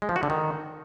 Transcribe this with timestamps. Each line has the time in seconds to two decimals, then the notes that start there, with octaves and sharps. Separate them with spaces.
0.02 G#3
0.09 F3
0.16 F#4
0.23 D3
0.30 D#3